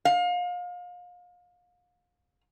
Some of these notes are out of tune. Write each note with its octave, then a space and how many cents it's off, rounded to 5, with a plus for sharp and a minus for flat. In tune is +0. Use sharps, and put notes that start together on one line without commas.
F5 +30